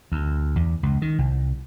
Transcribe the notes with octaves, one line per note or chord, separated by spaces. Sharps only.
D2
E2
C#2
D#3
C2